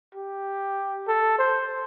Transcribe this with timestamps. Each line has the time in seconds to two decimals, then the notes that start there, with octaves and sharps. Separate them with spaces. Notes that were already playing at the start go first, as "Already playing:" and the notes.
0.14 G4
1.07 A4
1.38 C5